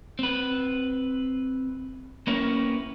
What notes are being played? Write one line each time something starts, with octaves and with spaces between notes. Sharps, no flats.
C4 B4
A#3 B3 C#4 E4 A#4